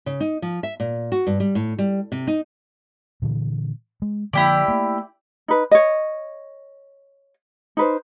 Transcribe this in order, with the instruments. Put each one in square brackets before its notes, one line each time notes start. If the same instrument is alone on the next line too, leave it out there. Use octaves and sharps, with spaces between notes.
[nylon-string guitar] C#3
D#4
F3
E5
A#2
F#4
G2
G3
A2
G3
C3
D#4
[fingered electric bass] A#2 D3 E3
G#3
[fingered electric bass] D3 F3 A#3 [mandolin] E4 G4 D5
[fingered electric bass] A3 A#3
[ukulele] D#4 B4
C#5 D#5
D#4 B4 C5